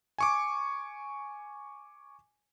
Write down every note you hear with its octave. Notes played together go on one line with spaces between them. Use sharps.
G#5 C#6 D6